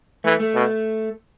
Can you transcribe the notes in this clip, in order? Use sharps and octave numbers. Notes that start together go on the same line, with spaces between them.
E3 A3
A3
B2